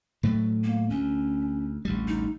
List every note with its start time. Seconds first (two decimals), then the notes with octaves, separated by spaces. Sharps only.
0.23 A2 F#3 A3
0.64 A#3
0.90 D2 C#4
1.85 A1 D2 G3
2.08 D#4